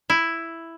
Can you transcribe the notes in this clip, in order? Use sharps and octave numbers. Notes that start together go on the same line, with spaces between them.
E4